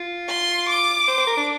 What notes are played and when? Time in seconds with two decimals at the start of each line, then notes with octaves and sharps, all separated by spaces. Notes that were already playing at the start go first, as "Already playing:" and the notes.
Already playing: F4
0.29 C6
0.69 D6
1.08 C5
1.18 C5
1.27 A#4
1.37 D4